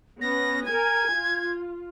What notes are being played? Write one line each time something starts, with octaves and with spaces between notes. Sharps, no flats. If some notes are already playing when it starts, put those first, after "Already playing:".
B3 C#4 A#6
A#4 G#5 G#6
F4